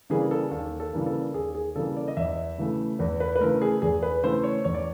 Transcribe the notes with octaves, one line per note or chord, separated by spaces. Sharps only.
C#3 E3 G3 A#3 G#4
A4
D#2 A4
A4
C#3 E3 G3 A#3
A4
D#2 G#4
G#4
C#3 E3 G3 A#3 A4
D5
D#5
E2 E5
C#3 E3 A3
E2 B4
B4
B4
C#3 E3 A3 A#4
G#4
E2 G#4
B4
C#3 E3 A3 C5
C#5
E2 C#5
D5